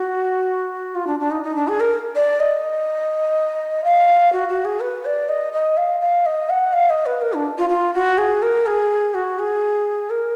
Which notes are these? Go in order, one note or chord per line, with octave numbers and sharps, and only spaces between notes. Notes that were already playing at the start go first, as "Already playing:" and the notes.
Already playing: F#4
F4
D4
D4
D#4
D#4
D4
G#4
A#4
D5
D#5
F5
F#4
F#4
G#4
B4
D5
D#5
D#5
F5
F5
D#5
F#5
F5
D#5
B4
A#4
D4
F4
F4
F#4
G#4
A#4
G#4
F#4
G#4
A#4